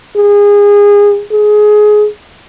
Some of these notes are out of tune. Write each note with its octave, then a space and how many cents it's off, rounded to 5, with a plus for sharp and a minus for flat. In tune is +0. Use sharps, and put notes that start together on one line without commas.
G#4 -25
G#4 +20